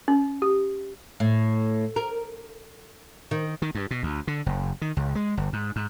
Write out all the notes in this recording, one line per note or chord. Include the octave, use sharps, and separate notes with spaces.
C#4
G4
A2
A#4
D#3
D#3
G2
B2
D2
D3
F#1
D#3
C#2
G#3
G1
G#2
G#2